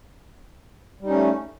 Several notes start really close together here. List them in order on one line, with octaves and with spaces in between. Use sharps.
G3 D#4 C#4 A3